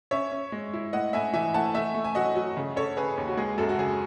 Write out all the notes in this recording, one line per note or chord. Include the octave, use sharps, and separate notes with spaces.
C#4 C#5 E5
C#4
G#3
E4
A2 D#5 F#5
A2 E5 G#5
E3 E5 G#5
A3 F#5 A5
A3 E5 G#5
A3
G#5
F#3 D#5 F#5
F#3
C#3
C#4 A4 C#5
C#4 G#4 B4
D#2
F#4
G#3 G#4
F#2 F#4 A4
F#4
C#3 G#4